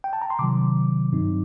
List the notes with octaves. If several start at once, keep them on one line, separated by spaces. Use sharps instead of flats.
G5
A5
A#5
C6
C3 D#3 F#3 D6
G2 F#3 C4 D#4